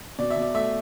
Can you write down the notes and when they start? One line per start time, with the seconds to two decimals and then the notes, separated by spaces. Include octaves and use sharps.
0.19 B2 D5
0.30 E5
0.36 B2
0.42 D5
0.54 A3 E5